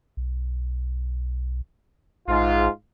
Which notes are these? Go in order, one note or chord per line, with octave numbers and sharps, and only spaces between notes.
B1
A#1 G#2 F4